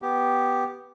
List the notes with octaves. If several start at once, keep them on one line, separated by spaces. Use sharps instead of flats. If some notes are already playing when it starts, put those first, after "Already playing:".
B3 G4